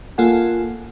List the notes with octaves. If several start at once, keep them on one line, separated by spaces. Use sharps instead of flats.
A#3 F4 A4 F#5 G#5